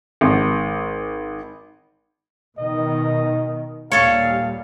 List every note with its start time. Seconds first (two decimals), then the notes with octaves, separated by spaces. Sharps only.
0.21 G#1
2.58 B2 D#3 D#5
3.92 D#2 A#2 G3 A4 C#5 F5